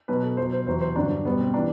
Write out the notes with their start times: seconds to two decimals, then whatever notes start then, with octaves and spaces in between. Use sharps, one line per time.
0.08 B2 F#3 B4
0.23 A4
0.37 B2 F#3 C5
0.53 C5
0.67 E2 C3 F#3 C5
0.81 C5
0.96 G2 D3 F#3 D4
1.25 B2 G3 B3
1.40 C4
1.54 E3 D4